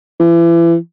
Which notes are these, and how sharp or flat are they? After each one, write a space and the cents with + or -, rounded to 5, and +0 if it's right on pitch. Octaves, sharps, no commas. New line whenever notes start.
E3 +35